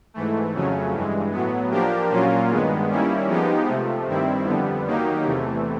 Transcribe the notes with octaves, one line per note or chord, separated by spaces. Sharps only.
G#2 E3 A3
F2 C#3 F#3 A3 C#4
G2 E3 G#3
A2 F#3 B3
F3 A#3 D4 G4 A#4
A#2 F#3 A#3 C#4 F4
G2 D#3 G#3 B3
D#3 G3 A#3 C#4 E4
F3 G#3 B3 D#4 G4
C3 F3 A3
G2 D#3 G3 C4 E4
F2 D3 G3 B3
D#3 F#3 A#3 D#4 G4
E2 C3 E3 A3